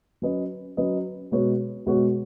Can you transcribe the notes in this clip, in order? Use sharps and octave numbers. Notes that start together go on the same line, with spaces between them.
F#3 C#4 B4 D#5
F#3 C#4 B4 D#5
B2 G#3 B3 F#4 C#5
B2 G#3 B3 F#4 C#5